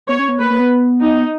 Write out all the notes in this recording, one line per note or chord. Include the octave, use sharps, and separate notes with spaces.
B3 C#5
C#4
B3
A#3 B4
A#3
B3
D#4